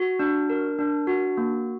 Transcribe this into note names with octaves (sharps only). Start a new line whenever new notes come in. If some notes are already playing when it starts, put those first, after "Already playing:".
Already playing: F#4
D4
A#4
D4
F#4
A#3